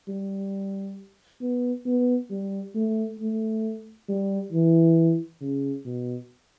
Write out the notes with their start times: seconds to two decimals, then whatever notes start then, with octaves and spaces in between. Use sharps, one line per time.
0.08 G3
1.41 B3
1.86 B3
2.30 G3
2.75 A3
3.20 A3
4.09 G3
4.52 E3
5.41 C#3
5.86 B2